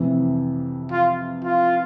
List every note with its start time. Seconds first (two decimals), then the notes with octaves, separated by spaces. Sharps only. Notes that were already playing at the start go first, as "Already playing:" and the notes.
Already playing: F2 C3 E3
0.92 F4
1.45 F4